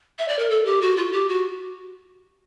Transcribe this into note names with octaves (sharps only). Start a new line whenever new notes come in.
E5
D5
A#4
A4
G4
F#4
F4
G4
F#4